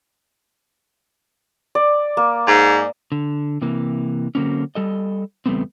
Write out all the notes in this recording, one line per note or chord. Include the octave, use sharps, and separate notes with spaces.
D5
A#3
G#2
D3
C3 E3 A#3
D3 F#3 A#3 C4 C#4
G3 A4 D#5
E2 C#3 G3 A3 B3 C4